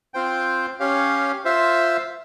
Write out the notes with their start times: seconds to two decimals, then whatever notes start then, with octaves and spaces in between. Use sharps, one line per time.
0.14 C4 F4 C5 G5
0.80 C#4 G4 C#5 F5
1.45 F4 C5 E5